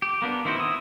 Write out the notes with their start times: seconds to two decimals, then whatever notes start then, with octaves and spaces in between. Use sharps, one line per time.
0.02 G4
0.22 A#3 B3 D4
0.45 D#3 C4 E4 F#4 C5
0.56 E4 D#6